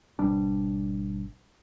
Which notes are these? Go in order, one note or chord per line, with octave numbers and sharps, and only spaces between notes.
G#1 B2 G3 D4